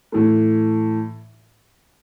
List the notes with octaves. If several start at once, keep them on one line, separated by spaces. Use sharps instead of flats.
A2 E3 A3